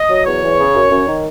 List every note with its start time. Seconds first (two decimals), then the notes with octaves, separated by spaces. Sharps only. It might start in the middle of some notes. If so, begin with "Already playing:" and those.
Already playing: D#5
0.09 F#3
0.25 E2 C#5
0.42 E2
0.58 C#3
0.74 F#2
0.90 F#2
1.07 D#3